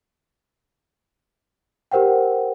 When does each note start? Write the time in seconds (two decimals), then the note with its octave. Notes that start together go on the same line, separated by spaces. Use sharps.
1.92 G4 A#4 C5 F#5 G5